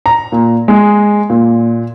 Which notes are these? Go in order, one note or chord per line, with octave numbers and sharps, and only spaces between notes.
A#5
A#2
G#3
A#2